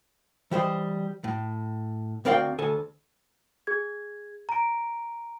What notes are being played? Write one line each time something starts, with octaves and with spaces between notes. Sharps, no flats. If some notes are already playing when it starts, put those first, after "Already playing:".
E3 G3 C5 D#5
A2
D2 C4 A#4 D5 F5 G5
D2 A4 G#5
G#4 G#6
A#5 D7